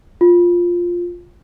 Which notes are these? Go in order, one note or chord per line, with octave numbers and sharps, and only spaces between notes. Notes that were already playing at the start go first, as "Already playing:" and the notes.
F4